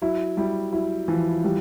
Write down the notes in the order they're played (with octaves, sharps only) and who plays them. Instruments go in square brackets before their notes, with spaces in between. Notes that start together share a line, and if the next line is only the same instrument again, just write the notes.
[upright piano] F#3 [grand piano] E4
[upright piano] G3 [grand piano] E4
[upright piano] F#3 [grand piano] E4
[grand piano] E3 [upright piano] F3
[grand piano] G3